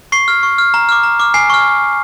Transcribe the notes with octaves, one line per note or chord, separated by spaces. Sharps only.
C#6 C7
F6
C#6
F6
A#5
D6 F6
A#5
D6 F6
G#5 C7
C#6 F6